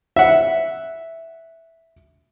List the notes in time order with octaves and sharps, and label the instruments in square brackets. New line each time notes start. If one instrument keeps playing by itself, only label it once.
[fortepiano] E5 F#5